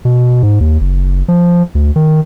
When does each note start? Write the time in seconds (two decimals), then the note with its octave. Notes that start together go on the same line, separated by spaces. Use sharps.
0.05 B2
0.43 G#2
0.61 D#2
0.81 F#1
1.28 F3
1.75 D2
1.96 D#3